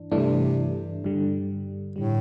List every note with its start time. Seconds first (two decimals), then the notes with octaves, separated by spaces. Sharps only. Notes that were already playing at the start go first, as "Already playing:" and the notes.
Already playing: G2 E3 D4
0.11 G2 C3 E3 A3 D4
1.04 G2 D3 G3
1.96 A2 D3 G3